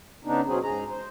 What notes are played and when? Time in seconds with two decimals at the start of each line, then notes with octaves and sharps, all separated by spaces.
0.25 C#3 B3 D4 D#4
0.47 B2 F#3 C4 C#4 G#4
0.63 G#2 G#4 A#5
0.88 C5